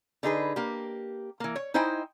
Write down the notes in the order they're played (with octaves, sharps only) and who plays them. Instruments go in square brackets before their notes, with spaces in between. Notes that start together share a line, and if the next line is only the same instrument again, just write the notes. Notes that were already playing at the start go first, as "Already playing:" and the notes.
[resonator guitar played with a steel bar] D3 D#4 G#4 B4
A#3 G4
E3 A#3
C#5
D#4 E4 C5 D#5 G5 G#5